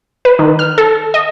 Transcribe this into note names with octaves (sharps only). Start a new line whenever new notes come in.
B4
D#3
F6
A4
D#5